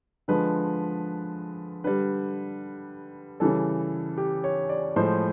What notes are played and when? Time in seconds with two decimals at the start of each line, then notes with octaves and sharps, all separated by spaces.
0.28 D3 F3 G#3 B4
1.84 D3 G3 B4
3.40 C#3 E3 G3 A4
4.18 G4
4.44 C#5
4.69 D5
4.96 A2 F3 G#3 C5